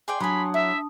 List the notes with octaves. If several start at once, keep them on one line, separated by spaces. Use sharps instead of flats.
G#4 D5 G5 C6
F#3 D4 G#5 A5 B5 C6 D#6
E4 E5